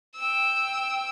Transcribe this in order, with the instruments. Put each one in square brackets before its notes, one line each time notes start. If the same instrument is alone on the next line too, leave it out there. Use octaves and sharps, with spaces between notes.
[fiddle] G5 E6